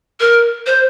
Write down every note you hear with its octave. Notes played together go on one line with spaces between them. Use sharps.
A#4
C5